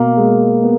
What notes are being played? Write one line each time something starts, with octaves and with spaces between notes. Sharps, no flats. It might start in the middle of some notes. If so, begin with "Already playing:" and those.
Already playing: B2 A#3
G#3
B3